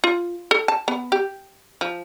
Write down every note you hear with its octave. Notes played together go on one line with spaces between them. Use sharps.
F4
A4
A5
B3
G4
F3